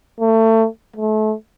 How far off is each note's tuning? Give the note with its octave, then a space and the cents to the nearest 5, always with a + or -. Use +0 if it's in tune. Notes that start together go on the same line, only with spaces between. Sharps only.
A3 +25
A3 -30